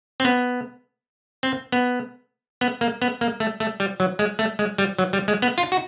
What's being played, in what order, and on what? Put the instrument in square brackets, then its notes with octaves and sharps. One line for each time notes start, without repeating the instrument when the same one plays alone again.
[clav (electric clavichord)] C4
B3
C4
B3
B3
A#3
B3
A#3
A3
A3
G3
F#3
G#3
A3
G#3
G3
F#3
G3
G#3
B3
F4
F#4